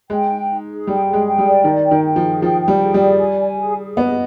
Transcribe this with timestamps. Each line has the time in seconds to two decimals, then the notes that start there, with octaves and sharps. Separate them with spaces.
0.10 G#3 G5
0.29 D#4
0.49 D#4
0.67 G#4
0.87 G3 G5
1.07 G#4
1.13 G#3
1.26 G5
1.38 G3
1.46 D5
1.64 D#3 D#4
1.84 G5
1.91 D#3
2.04 G5
2.16 F3
2.23 G#4
2.42 F3 G5
2.61 G5
2.68 G3
2.80 G#4
2.94 G3
3.00 D5
3.19 G#5
3.39 G#5
3.58 G#4
3.77 G#4
3.97 B3 D#5